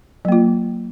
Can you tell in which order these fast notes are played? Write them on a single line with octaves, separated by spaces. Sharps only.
F#3 A#3 F4